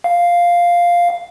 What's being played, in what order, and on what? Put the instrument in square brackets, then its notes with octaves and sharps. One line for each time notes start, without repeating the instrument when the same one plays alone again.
[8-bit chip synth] F5